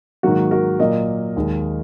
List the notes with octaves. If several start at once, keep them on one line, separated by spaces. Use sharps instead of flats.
G#2 D#3 F#3 A#3 F#4 A#4
F#4 A#4
A#2 F#3 A#3 A#4 D#5
D#2 D#3 G#3